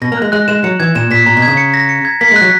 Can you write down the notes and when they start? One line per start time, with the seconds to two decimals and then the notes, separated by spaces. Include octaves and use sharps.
0.02 B2 A#6
0.12 A#3
0.17 G#3 F#6
0.32 G#3 F#6
0.48 G#3 E7
0.64 F#3 C#7
0.80 E3 G#6
0.95 A#2 E7
1.11 A#2 B6
1.26 A#2 A#5
1.37 B2
1.42 G#6
1.48 C#3
1.57 C#7
1.74 A#6
1.89 C#7
2.05 G#6
2.21 A#3 B6
2.32 G#3
2.36 F#6
2.41 F#3